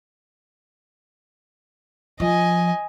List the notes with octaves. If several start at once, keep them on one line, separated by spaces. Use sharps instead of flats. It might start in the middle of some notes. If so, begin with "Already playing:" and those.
F3 D#5 G#5